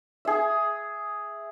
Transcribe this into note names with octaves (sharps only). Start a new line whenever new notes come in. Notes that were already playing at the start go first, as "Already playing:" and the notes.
G#4 E5